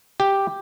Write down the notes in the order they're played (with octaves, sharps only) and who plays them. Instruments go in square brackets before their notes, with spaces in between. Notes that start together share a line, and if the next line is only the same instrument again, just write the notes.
[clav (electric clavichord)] G4